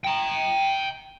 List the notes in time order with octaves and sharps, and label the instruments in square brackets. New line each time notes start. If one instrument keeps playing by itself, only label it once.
[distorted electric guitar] G5 A#5